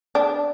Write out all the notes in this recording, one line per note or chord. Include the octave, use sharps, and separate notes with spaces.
D4